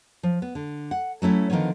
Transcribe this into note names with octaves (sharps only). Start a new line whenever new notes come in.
F3
B3
D3
F#5
F#3 A3 C#4 E4
D3 D#3 F3 B3 C#4